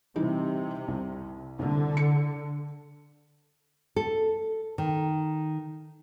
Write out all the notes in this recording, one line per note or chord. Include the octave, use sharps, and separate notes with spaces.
C3 E3 G3 D#4
C2
C2 D3
C#7
A4
D#3